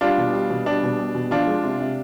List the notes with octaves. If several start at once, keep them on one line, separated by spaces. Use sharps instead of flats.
G3 D4 F4
B2
G3
B2
G3 D4
B2
G3
B2
F3 D4 F4
G#3
C3
C3